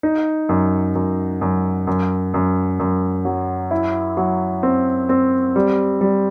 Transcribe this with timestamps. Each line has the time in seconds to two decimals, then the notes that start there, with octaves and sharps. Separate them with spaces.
0.03 D#4
0.49 F#2
0.95 F#2
1.41 F#2
1.87 F#2
2.34 F#2
2.80 F#2
3.25 F#3
3.71 E4
4.17 F#3
4.63 C4
5.09 C4
5.56 G3
6.01 G3